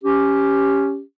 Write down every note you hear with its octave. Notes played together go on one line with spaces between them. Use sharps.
C#4 G4